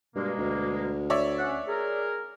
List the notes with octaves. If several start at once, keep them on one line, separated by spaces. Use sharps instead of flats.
G2 B2 G#3 A#3
D2
C#5 D5 E5
C#4 F#5
G#4 A#4